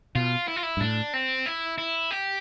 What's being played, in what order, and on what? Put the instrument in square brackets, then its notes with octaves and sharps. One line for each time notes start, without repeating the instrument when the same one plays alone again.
[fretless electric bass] B2 [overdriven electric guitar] F4
[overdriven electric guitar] E4
F4
E4
[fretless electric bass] G2
[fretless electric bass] A2 [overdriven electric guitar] D4
[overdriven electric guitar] C4
E4
E4
G4